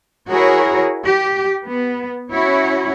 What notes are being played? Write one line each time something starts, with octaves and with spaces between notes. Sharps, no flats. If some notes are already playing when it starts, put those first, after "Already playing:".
E4 F#4 G#4 A#4 C#5
G4
B3
C#4 E4 F#4 C#5